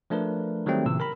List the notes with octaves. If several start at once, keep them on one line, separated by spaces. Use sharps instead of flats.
F3 A3 D4 A#4 B4
D#3 F#3 G3 A3 C4
A#2 C#3 E3 E6
A#4 A#5 B5